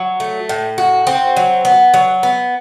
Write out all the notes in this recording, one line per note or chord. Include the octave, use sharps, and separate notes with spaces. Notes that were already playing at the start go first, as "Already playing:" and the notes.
Already playing: F#3
A3
A2
F#4
C4
F#3
B3
F#3
B3